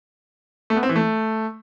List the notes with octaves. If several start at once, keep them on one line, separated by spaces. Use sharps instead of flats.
A3
B3
C4
E3
A3